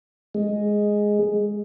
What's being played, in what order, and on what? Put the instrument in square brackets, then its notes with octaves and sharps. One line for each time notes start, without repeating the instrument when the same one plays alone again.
[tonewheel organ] G#3